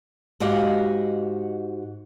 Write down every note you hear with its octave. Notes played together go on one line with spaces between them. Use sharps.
G#2 F#4 G4 D#5 F5